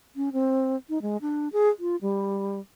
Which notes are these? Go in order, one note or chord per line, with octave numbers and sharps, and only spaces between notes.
C#4
C4
D#4
G#3
D4
G#4
F4
G3